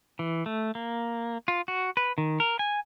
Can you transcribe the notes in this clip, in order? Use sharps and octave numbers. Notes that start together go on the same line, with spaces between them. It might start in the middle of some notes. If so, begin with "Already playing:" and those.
E3
A3
A#3
F4
F#4
B4
D#3
A#4
G#5